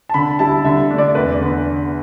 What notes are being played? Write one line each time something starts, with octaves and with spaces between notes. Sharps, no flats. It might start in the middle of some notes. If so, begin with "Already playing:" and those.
A5
D3 B5
G3 E4 A5
D3 E5
A3 D4
D5
E2 B4
D3 B3